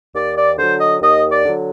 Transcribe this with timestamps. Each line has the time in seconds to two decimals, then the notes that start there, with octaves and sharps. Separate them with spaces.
0.15 D#2 D5
0.37 D5
0.58 D3 F#3 C5
0.80 D#5
1.01 D#2 D#5
1.30 D5
1.45 D3 F#3